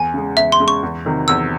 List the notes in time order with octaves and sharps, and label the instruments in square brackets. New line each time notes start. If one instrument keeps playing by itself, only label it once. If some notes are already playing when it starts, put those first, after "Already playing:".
Already playing: [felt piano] E2 [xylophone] G#5
[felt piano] C#3 G#3
[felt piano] E2 [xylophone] E5
[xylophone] C6
[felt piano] C#3 G#3
[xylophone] C#6
[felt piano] E2
C3 D#3 F#3
[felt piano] E2 [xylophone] E6